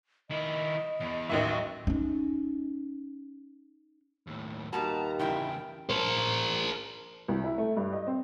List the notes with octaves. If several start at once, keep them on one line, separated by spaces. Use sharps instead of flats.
D#3 E4 D#5
E2
A1 D#2 F#3 E5
C#4 D#4
D#2 A2
D#2 B2 G3 F#4 A5 A#5
E2 G2 A#2 C#3 E4 G5
A#4 C5
C2
E4
A3
G2
D#5
C4